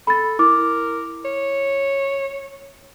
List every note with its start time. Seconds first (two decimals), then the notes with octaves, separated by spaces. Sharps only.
0.07 A4 B5 A6
0.39 E4 A#4 D6
1.25 C#5